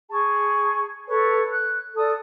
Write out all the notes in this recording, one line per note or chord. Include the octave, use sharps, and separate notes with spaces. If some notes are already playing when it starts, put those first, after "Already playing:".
G#4 A5 C#6
A4 B4 C#5
F#6
A4 D5 A5 D#6